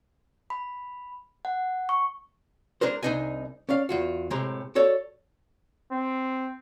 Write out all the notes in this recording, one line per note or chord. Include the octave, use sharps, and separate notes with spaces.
B5
F#5
C#6
G#3 D4 G#4 A#4 C5
C2 D4 D#4 D#5 G#5
C#4 D5 F5
E2 F4 F#4
A2 C3 G#3 G4 A#5 C6
F#4 A4 C#5 D5
C4